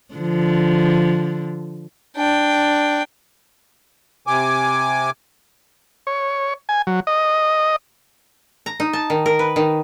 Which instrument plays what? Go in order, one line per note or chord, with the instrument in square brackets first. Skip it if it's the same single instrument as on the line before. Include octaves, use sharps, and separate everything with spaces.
[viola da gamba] D3 F3
[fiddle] D4 G5
[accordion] C3 G#5 D6
[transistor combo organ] C#5
G#5
F#3
D#5
[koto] A#5
D#4
A5
D#3
A#4
B4
D#3